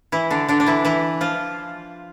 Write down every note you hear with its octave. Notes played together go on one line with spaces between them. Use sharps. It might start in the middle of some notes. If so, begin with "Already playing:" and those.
E3 E4
D3 D4
D3 D4
D4
E3 E4
E3 E4
F3 F4